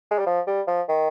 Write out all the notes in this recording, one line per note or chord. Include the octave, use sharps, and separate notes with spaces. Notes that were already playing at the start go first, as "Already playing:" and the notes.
G#3
G3
F3
G3
F3
D#3